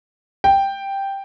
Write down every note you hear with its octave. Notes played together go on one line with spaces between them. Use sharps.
G5